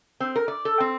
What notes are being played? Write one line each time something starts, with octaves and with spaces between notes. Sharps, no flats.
C4
A#4
D5
A4
C4